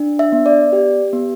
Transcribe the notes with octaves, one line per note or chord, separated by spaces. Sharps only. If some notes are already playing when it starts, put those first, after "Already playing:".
Already playing: D4
E5
B3
D5
G4
B3